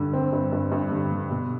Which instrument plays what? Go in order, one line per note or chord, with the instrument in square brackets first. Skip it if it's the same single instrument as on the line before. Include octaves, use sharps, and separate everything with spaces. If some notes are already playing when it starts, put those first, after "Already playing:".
Already playing: [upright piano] G2 D3
C4
G2
G2
G2
D3
D3
B2